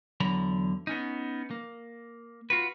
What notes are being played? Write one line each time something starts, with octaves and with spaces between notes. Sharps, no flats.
E2 D3 F#3 A#5 B5
B3 C#4 D#4
A#3
F4 F#4 B4